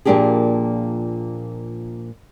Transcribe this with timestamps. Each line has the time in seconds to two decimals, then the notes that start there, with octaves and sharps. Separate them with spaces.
0.05 A#2 F3 A#3 D4 G4 G#4